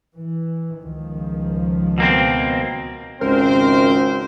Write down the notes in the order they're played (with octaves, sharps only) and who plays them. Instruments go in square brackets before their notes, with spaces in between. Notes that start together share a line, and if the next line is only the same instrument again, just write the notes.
[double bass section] E3
C#2 D#3 F3
[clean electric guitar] B2 A#3 C4
[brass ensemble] G#1 C5 [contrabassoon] C#2 [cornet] C4 [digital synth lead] A#4